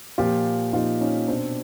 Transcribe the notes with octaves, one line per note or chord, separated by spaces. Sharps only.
A#2 F3 F4 G4
A#2 F3 D#4 F4
C#4 D#4
B2 C4 D4